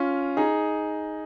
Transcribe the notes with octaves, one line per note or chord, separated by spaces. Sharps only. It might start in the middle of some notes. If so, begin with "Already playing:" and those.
Already playing: C#4 F4
D#4 G#4